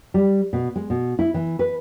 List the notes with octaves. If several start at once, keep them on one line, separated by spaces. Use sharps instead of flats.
G3
B2
G#3
B2
E4
E3
B4